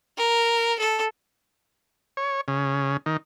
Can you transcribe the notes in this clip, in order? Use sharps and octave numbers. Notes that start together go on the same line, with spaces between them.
A#4
A4
C#5
C#3
D#3